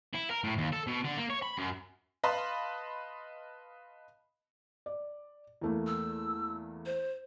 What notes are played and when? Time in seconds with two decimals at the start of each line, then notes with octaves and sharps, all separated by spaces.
0.13 E4
0.30 A#4
0.44 A2
0.58 D#2
0.72 A4
0.87 B2
1.04 D3
1.17 A#3
1.30 C#5
1.42 B5
1.58 F#2
2.23 B4 D#5 F5 A5 B5 C6
4.86 D5
5.61 E2 A3 A#3
5.87 E6
6.86 C5